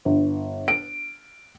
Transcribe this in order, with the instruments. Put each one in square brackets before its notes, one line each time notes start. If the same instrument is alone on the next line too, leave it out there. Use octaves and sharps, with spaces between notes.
[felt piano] G1
D7